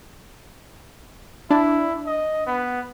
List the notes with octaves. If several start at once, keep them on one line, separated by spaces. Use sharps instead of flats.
D4 E4
D#5
B3